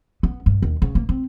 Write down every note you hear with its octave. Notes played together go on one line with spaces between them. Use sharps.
B3
G2
D#2
C#3
A#3
C4